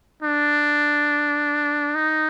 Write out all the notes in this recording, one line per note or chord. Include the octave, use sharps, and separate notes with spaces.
D4
D#4